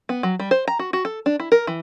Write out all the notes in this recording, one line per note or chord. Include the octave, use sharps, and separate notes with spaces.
B3
F#3
G3
C5
A#5
F#4
F#4
A4
D4
E4
A#4
E3